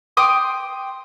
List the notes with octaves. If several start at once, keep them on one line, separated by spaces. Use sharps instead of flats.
G5 C6 D6 D#6